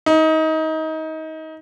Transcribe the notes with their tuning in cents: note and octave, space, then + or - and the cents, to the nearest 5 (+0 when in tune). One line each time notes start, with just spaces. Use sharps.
D#4 +25